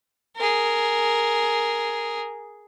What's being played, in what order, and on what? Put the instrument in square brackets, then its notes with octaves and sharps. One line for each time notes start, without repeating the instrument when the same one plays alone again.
[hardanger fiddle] G#4 A#4